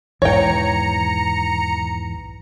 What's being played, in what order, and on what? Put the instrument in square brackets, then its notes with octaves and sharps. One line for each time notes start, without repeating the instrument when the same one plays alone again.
[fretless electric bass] B1 E2 G#2 [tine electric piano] E3 [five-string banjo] C#5 G5 [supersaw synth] A#5 C#7